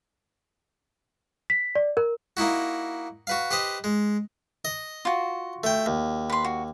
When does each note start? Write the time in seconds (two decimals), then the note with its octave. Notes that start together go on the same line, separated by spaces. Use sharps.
1.50 B6
1.75 D5
1.97 A#4
2.37 A#3 D#4 E4 F#4
3.27 F#4 B4 F5
3.51 G4 B4 C5 D#5
3.84 G#3
4.65 D#5
5.05 F4 F#4
5.64 A3 G5
5.86 D#2
6.30 B4 C6
6.45 F#4